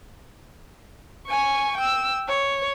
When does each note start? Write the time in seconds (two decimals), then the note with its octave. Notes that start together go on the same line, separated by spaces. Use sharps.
1.28 G#5 C#6
1.77 G5 E6
2.29 C#5